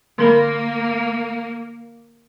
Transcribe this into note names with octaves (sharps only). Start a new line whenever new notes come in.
D3 A#3 A#4 B5